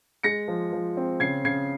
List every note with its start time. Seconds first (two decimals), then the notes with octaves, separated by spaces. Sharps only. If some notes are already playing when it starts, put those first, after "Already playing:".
0.23 G#3 A#6 C#7
0.48 F3
0.73 F3
0.97 C4
1.20 C#3 G#6 C7
1.44 C#3 G#6 C7